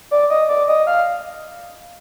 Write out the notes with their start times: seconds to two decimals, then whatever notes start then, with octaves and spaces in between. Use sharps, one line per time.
0.11 D5
0.30 D#5
0.49 D5
0.68 D#5
0.87 F5